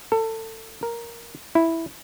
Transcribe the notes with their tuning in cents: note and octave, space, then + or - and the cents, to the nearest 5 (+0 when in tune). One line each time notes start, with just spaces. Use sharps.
A4 +25
A#4 +5
E4 -5